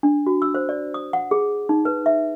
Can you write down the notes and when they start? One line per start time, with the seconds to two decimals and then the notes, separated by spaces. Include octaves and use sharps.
0.03 D4
0.26 F#4
0.42 E6
0.54 C5
0.69 D5
0.94 D#6
1.13 F#5
1.31 G#4
1.69 D#4
1.85 B4
2.06 E5